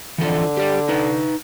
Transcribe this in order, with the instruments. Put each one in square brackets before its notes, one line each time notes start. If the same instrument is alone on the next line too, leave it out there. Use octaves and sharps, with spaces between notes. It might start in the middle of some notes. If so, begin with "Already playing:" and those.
[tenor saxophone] D3 [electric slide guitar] E3 F3 A4
[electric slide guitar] G4 D5
D#4 B4